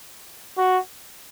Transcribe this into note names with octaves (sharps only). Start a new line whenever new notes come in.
F#4